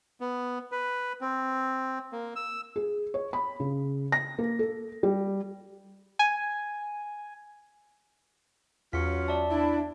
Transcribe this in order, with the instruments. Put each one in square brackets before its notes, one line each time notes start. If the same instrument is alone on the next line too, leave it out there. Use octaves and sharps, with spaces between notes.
[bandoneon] B3
B4
C4
A#3
E6
[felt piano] G#4
C#5
B5
C#3
A#6
A#3
A4
G3
[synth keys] G#5
[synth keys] E2 [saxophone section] F#3 C#4 F4 [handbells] B6 C#7
[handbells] D5 E5 A5
[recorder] D4 [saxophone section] E4